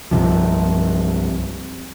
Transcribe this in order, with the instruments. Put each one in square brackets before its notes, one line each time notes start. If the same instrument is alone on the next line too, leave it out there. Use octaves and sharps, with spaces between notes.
[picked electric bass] C2 G2 C3 F3